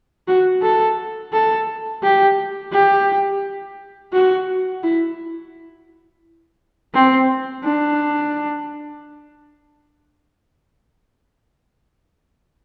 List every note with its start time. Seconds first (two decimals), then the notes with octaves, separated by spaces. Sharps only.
0.28 F#4
0.63 A4
1.33 A4
2.03 G4
2.72 G4
4.13 F#4
4.83 E4
6.94 C4
7.64 D4